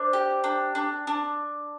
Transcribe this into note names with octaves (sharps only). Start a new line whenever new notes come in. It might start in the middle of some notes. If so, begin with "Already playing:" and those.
Already playing: D4 C5
G4
D4
D4
D4